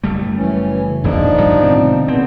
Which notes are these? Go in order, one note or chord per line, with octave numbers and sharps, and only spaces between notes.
F#1 G3 A3
E3 C#4
D#1 E2 F3 A#3 D4 D#4
G#2 D#3 F#3
B2 D3 C4
A#2 C#3 B3 C4